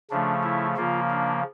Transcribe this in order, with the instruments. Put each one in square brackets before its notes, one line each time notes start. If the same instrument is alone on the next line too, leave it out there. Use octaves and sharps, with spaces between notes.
[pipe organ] C#3 F3 A3 D4
E4
C#3 F3 A#3 F4
D4